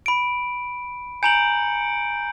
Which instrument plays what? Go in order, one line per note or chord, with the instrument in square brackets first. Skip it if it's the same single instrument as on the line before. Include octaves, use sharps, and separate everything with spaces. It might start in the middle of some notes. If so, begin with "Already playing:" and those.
[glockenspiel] B5 D7
[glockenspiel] G#5 A#5 F#7 [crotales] G6 C#7 D7